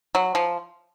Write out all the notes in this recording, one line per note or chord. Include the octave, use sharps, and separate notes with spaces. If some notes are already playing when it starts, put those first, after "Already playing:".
F#3
F3